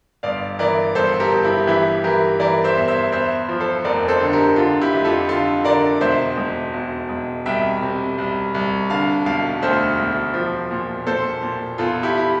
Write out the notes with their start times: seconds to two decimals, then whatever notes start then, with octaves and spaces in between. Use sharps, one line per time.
0.23 G1 D5 F5
0.59 E3 A#4 D5
0.95 G1 A4 C5
1.20 G4 A#4
1.32 G1
1.43 E4 G4
1.67 E3 E4 G4
2.04 E3 G4 A#4
2.40 E3 A#4 D5
2.64 C5 E5
2.76 E2
2.88 C5 E5
3.12 E2 C5 E5
3.49 F3
3.60 A4 C5
3.84 F1 A#4 D5
4.08 A4 C5
4.20 D3
4.33 G4 A#4
4.56 D3 F4
4.81 E4 G4
4.93 F1
5.04 F4 A4
5.28 D3 F4 A4
5.64 D3 A#4 D5
6.01 E1 C5 E5
6.37 E1
6.73 E1
7.09 E1
7.46 C2 E5 G5
7.82 C3
8.18 C2
8.54 C2
8.89 D3 F5 A5
9.25 E1 F5 A5
9.62 D2 A4 C5
9.99 E1
10.34 F3
10.71 A#2
11.07 A#2 A4 C5
11.43 A#2
11.78 E2 F4 A4
12.03 E4 G4
12.18 E4